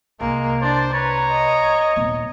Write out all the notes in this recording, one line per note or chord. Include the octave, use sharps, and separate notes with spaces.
C2 G#3 A#3
D4 C5 D5
B4 C#5 A#5
D#5
D#1 B3